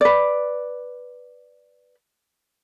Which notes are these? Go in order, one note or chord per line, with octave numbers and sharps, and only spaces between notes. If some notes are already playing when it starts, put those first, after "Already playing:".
B4 D5